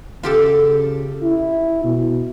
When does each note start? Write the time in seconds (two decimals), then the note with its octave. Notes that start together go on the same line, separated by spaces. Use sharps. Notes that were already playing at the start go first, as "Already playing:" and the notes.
0.23 C#3 F4 G4 A4
1.23 E4
1.84 B2